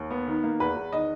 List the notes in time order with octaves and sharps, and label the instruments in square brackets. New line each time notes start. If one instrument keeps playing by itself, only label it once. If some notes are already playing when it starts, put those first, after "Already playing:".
Already playing: [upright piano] D#2
B3
D#3
A#3
E2 B4
E2
D#3 D#5